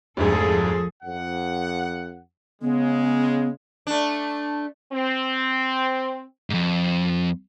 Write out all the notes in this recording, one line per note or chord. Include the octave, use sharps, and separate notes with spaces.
F1 D2 G#2 F3 G#4 A4
F2 F#5
C#3 G#3 B3
A3 D4
C4
F2 G#2